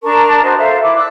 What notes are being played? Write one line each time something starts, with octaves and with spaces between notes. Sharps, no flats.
D4 A#4 A5 C#6
F#4 C5 D#5 C6
A4 C5 E5 F5
E4 D6
D5 D6 E6 F#6